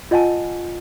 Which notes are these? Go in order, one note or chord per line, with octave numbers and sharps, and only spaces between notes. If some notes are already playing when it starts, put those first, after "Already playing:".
F4 D#5 F#5 G#5 A5